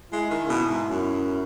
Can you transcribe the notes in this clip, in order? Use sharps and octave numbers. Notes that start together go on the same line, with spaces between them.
G#3 E4
D#3
C#3
B2
G#2
F#2